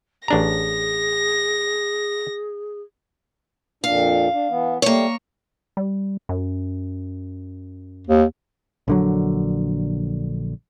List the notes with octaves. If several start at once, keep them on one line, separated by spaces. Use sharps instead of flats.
A1 D4 G#4 A#5 A#6
F2 A#2 D4 F5
D4
E3 B3
G3 A3 A#3 C#5
G3
F#2
D#2
A#1 D3 F#3